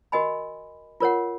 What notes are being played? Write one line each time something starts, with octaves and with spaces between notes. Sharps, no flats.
F#4 A#4 D#5 G#5 B5
F4 A#4 C#5 F#5